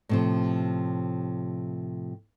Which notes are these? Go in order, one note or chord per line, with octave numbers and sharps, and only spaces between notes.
A2 C3 F3